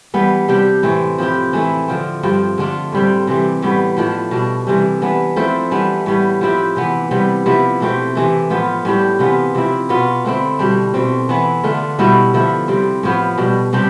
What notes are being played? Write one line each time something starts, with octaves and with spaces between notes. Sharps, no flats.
E3 G3 B3
C3 G3 D4 G4
A2 E3 A3 C4
F3 C4 E4 G4
E3 A3 E4
D3 F3 C4
G2 F3 C4
D3 A3 D4 F4
A2 G3 C4
C3 E3 G3
A2 G3 B3
A2 F3 A3 D4
B2 G3 D4
C3 E3 G3
E3 B3 D4
F3 A3 C4 E4
E3 G3 B3 D4
A2 G3 B3
F3 C4 E4 G4
C3 E3 B3
C3 G3 B3
C3 F3 B3 E4
B2 A3 C4 G4
C3 E3 A3
A2 F3 B3 F4
A2 G3 D4 G4
C3 E3 B3 F4
C3 F3 C4 E4
B2 B3 F4
D3 A3 C4 E4
B2 G3 D4
B2 A3 C4
E3 B3 E4
D3 A3 D4 F4
B2 G3 B3 E4
D3 F3 A3 E4
C3 G3 C4
A2 F3 B3
B2 G3 D4
C3 G3 D4 G4